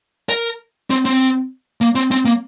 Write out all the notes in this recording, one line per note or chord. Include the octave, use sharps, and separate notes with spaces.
A#4
C4
C4
A#3
C4
C4
A#3